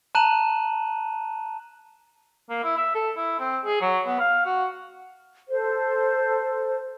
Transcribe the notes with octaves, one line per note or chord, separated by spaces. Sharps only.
A5 A#5 F#6 D#7 E7 F#7
A#3
E4
E5
A4
E4
C4
G#4
F#3
B3
F5
F#4
A4 C5